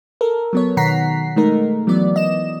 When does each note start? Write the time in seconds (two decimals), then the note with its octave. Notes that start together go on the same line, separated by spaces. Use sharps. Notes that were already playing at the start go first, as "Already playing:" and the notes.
0.21 A4 A#4
0.53 F#3 B3 C#5
0.77 B2 D#3 F#5 A#5 B6 C7
1.36 G#3 A3 D#4 A#4
1.87 E3 F#3 B3 D5
2.16 D#5 E7